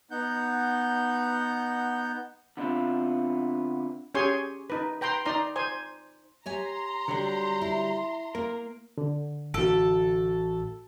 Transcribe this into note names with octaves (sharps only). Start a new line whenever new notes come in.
B3 D#4 F#5 G6
D3 B3 C4 D4 E4 F4
C#4 G4 G#4 C#5 G#5 C6
D#4 B4
B4 G5 A#5 C6
D#4 D5 A#5 C6
C5 G#5
G4 C#5 G#5 A#5 C6
D3 F#3 G3
E4
A#3 A#4
D3
A1 F#4 A4 D7